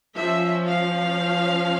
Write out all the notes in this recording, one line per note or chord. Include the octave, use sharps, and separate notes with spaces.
F3 C#4 E5
F5